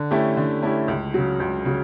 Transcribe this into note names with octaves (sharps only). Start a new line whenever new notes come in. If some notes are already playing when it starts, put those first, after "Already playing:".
Already playing: D3
A3 C#4 E4 G4
D3
A3 C#4 E4 G4
C#2
C#3 F#3
C#2
C#3 F#3